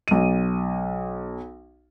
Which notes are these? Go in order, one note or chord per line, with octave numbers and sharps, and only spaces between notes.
B1 D#7